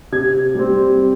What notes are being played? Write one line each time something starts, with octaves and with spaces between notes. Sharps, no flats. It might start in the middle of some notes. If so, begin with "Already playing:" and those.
C3 G#6
G3 C4